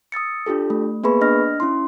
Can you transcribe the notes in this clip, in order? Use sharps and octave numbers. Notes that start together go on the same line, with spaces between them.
D#6 E6 A6 C#7
D4 F4 G4 A4
A3
A#3 B3 G#4 B4 B5 C#6
D4 D#5 F6 A#6
C#4 E4 C6